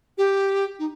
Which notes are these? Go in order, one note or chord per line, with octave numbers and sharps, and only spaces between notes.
G4
D#4